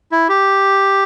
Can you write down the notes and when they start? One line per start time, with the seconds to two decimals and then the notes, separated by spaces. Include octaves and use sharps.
0.12 E4
0.29 G4